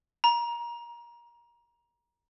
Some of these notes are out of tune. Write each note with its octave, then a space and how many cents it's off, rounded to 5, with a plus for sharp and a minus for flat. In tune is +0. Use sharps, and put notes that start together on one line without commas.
A#5 +25